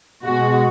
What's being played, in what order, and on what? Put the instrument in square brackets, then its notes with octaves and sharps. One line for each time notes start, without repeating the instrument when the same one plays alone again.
[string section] B2 G#3 F#4